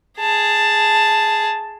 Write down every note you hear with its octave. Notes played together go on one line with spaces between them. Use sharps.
G#4 A5